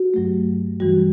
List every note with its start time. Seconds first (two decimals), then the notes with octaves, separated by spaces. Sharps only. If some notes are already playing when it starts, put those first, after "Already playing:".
Already playing: F#4
0.14 G2 F#3 A3
0.80 G2 E3 G3 F#4